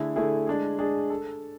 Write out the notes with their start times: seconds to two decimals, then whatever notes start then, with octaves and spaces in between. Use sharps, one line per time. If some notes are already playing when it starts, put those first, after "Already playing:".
Already playing: D3 A3 E4 G#4
0.16 D3 A3 E4 G#4
0.47 G#3 D4 G#4
0.79 G#3 D4 G#4
1.10 A4